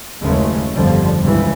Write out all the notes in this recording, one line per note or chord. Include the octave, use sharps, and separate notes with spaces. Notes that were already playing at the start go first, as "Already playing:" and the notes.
F#1 D#2 C#3 G#3 A3 C#4
G1 F2 D3 F3 G3
C#2 G2 C#3 E3